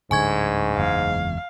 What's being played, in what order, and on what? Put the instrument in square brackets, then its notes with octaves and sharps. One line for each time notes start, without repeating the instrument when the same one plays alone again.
[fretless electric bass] D1 D3 [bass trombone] G#2 [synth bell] G#5 C#6 G#6
[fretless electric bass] F#1 E2 G#3 [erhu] F5